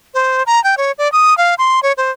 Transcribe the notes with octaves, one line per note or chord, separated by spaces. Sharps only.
C5
A#5
G5
C#5
D5
D#6
F5
C6
C#5
C5